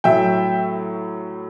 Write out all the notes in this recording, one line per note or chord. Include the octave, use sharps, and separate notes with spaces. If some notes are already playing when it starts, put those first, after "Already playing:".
A2 F#3 E5 G5